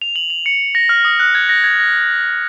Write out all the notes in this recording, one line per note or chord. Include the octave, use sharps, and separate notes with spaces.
F7
F#7
F7
C#7
A#6
F6
D#6
F#6
G#6
A#6
G#6
A#6